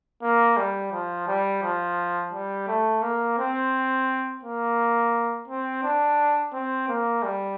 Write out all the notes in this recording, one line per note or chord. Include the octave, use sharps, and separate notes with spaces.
A#3
G3
F3
G3
F3
G3
A3
A#3
C4
A#3
C4
D4
C4
A#3
G3